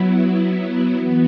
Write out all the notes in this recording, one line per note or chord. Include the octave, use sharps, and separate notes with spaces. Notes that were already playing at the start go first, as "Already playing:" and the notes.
Already playing: F#3 B3 E4
E3 B3 F#4